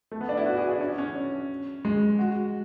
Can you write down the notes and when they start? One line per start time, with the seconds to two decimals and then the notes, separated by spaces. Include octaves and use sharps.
0.12 A3
0.21 B3
0.29 D4
0.37 E4
0.46 F#4
0.58 G#4
0.69 D4
0.81 C#4
0.98 C#4
1.85 G#3
2.19 F#4